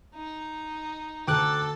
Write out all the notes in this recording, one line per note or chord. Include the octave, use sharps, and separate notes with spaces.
D#4
D2 A4 G5 A5 D6 F#6